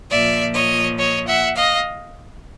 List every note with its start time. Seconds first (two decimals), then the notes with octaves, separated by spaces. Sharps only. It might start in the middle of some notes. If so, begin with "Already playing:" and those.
0.11 A#2 F3 D5 E5
0.54 C#5 D#5
0.98 C#5 D#5
1.27 E5 F#5
1.56 D#5 F5